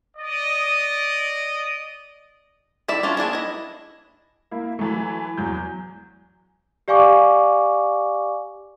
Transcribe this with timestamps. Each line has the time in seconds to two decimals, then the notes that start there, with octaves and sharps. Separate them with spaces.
0.17 D5 D#5
2.88 D#3 E4 D5 E5
3.03 C#4 D4 F4
3.17 A#3 D4 E4 G#4
3.33 E4 D#5
4.51 A#3 E4
4.79 E3 F#3 A3
5.38 E2 F#3 G6
6.88 G4 D5 F5 G#5 C#6 D6